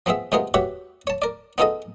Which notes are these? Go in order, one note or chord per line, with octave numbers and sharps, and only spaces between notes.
F3 B3 C4 G#4 E5
C3 G#3 B3 F4 G#4 A#4
F#4 G4 B4 C#5 E5
C#5 A5
A#4 D5
B3 D#4 F4 G#4 A4 D#5